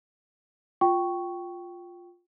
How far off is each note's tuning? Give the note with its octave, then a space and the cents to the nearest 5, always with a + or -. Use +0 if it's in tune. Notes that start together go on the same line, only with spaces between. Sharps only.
F4 +10 G5 -10 C#6 +0